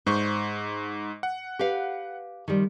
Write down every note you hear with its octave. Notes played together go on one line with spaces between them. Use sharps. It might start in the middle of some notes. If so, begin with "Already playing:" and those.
G#2 C5 C#6
F#5
G4 B4 F5
D#3 F3 G3